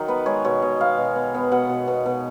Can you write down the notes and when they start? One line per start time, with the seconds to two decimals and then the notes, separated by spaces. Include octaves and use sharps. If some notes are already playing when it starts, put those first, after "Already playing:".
Already playing: D#3 F#3 D#4
0.08 B3 B4
0.26 G#3 C#5
0.45 B2 C#5
0.62 B2 D#5
0.80 B3 F5
0.98 B2
1.16 B3
1.34 B3
1.52 B2 F#5
1.69 B2
1.88 B2
2.06 B2